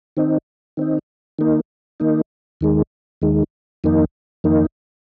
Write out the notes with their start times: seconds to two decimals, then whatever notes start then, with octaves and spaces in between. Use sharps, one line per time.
0.17 D#3 C4 D#4
0.77 D#3 C4 D#4
1.39 D#3 A#3 D#4
2.00 D#3 A#3 D#4
2.61 D#2 D#3 G#3
3.22 D#2 D#3 G#3
3.84 F2 D#3 A#3 D#4
4.44 F2 D#3 A#3 D#4